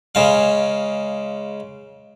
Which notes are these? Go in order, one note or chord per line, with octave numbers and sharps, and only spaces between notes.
C#3 G#3 F5